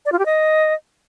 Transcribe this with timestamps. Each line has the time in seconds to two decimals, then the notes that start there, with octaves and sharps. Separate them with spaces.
0.05 D5
0.12 F4
0.19 G4
0.25 D#5